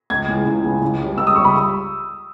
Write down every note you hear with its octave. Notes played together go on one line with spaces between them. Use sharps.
C#2 G#6
C#3 E3 G#3
C#2
C#3 E3 G#3
C#2
C#3 G3
C#2 E6
D#6
C#3 G3 C#6
B5